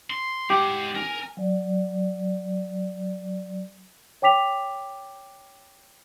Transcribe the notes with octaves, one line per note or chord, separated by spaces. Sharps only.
C6
G#3 G4 F#5
A#4 G#5
F#3 D5
C#5 G5 D6 B6 F7